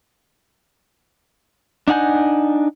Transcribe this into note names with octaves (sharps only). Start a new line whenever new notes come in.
D4 D#4 F#5 G#5 G6